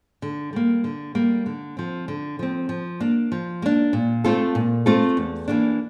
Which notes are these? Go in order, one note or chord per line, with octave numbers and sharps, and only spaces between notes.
D3
G3 A#3
D3
G3 A#3
D3
F3 C4
D3
F3 C4
F3
A#3 D4
F3
A#3 D4
A#2
A3 C4 F4 A4
A#2
A3 C4 F4 A4
E2
E3 A#3 D4